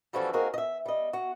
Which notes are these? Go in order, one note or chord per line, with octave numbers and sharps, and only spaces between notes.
E3 F3 G3 C#4 F#4 A4
A#3 C4 D#4 F#4 G#4 A#4
D#5 E5
G3 D#5
F#4